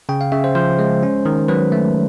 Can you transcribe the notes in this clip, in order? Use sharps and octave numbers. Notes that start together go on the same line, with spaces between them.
C#3 G5
F5
C#3 E5
C5
F3 C5
G#3
C#4
D#3
F#3 B4
A3